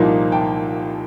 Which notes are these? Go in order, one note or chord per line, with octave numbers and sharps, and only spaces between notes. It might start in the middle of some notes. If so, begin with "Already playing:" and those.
Already playing: C2 A#2 F3 A#3 D#4
G5 A5